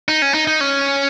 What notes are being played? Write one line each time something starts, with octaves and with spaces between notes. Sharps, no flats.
D#4
C#4
D#4
D#4
C#4